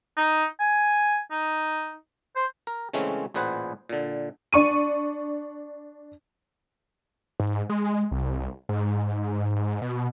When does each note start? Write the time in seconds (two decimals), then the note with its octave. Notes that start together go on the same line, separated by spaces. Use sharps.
0.17 D#4
0.60 G#5
1.31 D#4
2.36 C5
2.67 A#4
2.93 C#3 E3 G#3 A3 C4 C#4
3.34 A1 A#2 G#4 B4 C5 F#5
3.89 A#2 D3
4.53 D4 C#6 D#7
7.40 G#2
7.69 G#3
8.11 C2
8.69 G#2
9.82 B2